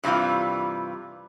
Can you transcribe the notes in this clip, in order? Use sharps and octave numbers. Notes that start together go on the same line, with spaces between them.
G2 C3 E3 G3 F4